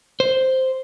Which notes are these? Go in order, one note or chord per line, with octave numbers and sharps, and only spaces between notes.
C5